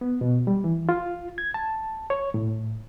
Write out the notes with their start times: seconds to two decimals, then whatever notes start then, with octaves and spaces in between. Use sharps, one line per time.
0.01 B3
0.21 B2
0.47 G3
0.64 E3
0.89 F4
1.38 G#6
1.54 A5
2.10 C#5
2.34 A2